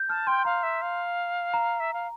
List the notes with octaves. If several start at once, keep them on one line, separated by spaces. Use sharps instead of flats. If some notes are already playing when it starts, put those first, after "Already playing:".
Already playing: G6
A5 F6
G5 C6
F5 A#5
E5
F5
A#5
E5
F5